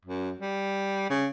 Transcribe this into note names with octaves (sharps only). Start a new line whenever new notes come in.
F#2
G3
C#3